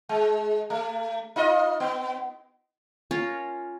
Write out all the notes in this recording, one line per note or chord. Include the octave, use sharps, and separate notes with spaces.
G#3
A3
D#4 F4 D#5
B3
C#4 F4 A#4 C#5